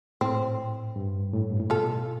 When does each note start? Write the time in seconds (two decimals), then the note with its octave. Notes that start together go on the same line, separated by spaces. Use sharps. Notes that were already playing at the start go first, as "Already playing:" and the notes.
0.21 A2 C4
0.96 G2
1.33 A2
1.50 G2
1.60 A2
1.70 B2 F4 A4